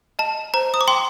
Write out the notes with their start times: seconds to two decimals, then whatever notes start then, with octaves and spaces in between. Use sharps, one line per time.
0.19 D#5 A5
0.54 C5 A#5
0.74 D#6
0.81 D6
0.88 G5 C6